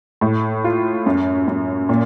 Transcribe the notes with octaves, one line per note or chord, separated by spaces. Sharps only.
A2
F4
F#2
F#2
A#2